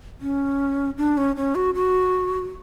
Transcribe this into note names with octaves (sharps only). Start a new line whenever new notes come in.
C#4
D4
C#4
C#4
F#4
F#4